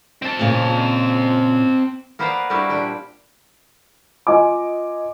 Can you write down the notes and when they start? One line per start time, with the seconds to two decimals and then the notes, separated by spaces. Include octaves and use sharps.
0.22 C4 A5
0.39 A#2 C#3
2.19 A#3 B3 B4 C5 D5 A#5
2.50 G3 A#3 D4 E4 F#4 G4
2.69 A#2 D4 G5
4.27 F4 D#5 G#5 D6